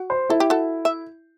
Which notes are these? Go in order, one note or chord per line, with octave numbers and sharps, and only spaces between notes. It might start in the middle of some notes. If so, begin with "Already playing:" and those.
Already playing: F#4
C5
E4 A4
G4
F#4 A4
E5